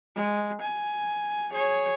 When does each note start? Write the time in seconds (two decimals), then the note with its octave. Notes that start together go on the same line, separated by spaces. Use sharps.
0.16 G#3
0.61 G#5
1.52 G#4 C#5